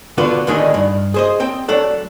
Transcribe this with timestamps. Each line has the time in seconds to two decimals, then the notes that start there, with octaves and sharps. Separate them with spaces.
0.18 D3 B3 D4 F4 F#4 B4
0.47 D2 A2 D#3 G#3 D4 G#4
0.74 G2
1.14 G#4 C5 D#5
1.40 C4 G5
1.68 F#3 A3 D4 A4 F#5